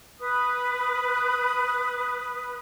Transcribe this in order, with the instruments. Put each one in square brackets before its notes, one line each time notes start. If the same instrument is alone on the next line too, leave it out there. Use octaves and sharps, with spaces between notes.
[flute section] B4 D#6